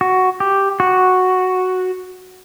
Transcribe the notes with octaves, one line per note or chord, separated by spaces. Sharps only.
F#4
G4
F#4